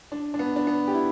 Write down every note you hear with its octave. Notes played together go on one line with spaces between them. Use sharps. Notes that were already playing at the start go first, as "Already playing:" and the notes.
D4
D4
B3
D4
B3
G4
E4